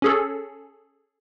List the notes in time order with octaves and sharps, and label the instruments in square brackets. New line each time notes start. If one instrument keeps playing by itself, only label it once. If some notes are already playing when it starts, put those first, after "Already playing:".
[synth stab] C#4 G#4 A4